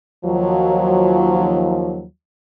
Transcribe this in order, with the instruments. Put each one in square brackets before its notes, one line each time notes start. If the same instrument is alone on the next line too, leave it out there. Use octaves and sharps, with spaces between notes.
[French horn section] D#2 F3 F#3